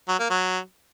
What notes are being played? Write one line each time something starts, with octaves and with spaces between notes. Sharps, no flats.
F#3
A#3
F#3